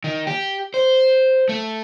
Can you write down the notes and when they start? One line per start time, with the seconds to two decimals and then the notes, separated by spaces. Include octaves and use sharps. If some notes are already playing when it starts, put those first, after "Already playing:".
0.04 D#3
0.27 G4
0.74 C5
1.49 A3